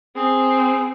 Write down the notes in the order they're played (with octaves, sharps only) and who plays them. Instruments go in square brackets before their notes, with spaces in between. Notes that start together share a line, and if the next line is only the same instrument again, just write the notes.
[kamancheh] C4 [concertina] G#4